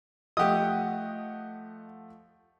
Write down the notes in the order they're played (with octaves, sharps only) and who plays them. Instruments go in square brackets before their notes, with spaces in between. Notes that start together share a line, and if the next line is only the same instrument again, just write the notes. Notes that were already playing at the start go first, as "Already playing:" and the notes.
[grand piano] F3 A3 [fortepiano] G4 D#6 [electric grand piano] D#5 F#5